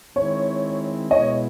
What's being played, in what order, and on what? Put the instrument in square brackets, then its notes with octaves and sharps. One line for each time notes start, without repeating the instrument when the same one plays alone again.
[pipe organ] D#3 G#3 C4 E4 [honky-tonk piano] C#5
[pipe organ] B2 G#3 B3 E4 [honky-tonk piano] C#5 D#5